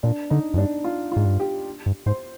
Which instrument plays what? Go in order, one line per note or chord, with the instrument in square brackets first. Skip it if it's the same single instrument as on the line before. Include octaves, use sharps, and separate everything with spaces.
[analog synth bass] A#2 [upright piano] D4
[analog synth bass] D3 [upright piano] D#4
[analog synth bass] F2
[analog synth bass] G2 [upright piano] D4
[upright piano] F4
[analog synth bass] G#2 [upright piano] F4
[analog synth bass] G2
[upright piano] G4
[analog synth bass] G2
[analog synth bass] G#2 [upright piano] C5